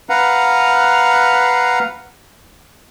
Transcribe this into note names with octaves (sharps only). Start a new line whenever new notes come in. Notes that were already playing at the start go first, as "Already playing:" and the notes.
B4 F5 F#5 A#5